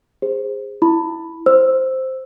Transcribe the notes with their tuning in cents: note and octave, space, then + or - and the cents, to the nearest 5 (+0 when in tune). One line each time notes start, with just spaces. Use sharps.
G#4 -25 C5 +0
E4 +0 B5 +0
C5 +0 E6 +0